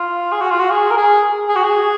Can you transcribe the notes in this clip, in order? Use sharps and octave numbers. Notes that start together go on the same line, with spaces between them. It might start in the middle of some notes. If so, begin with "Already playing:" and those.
Already playing: F4
G#4
F#4
F4
F#4
G#4
A#4
G#4
G#4
F#4
G#4